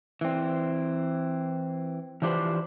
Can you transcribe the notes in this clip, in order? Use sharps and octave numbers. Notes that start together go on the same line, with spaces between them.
E3 C4
E3 F3 D4 G4 B4 C5